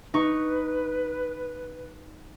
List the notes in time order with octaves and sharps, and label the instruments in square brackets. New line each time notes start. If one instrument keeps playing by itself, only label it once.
[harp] D#4 C#6 [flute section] B4